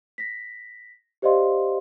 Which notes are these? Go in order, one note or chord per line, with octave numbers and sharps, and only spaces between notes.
A#6 B6
G4 C5 D5 D#5 F5 C6